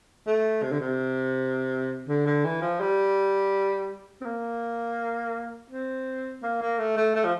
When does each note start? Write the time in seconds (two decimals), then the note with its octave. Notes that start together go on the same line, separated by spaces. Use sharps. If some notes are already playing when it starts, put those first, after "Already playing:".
0.27 A3
0.62 C3
0.72 D3
0.80 C3
2.08 D3
2.26 D3
2.44 E3
2.62 F3
2.80 G3
4.21 C4
4.25 A#3
5.70 C4
6.43 A#3
6.62 A#3
6.79 A3
6.97 A3
7.16 A3
7.24 F3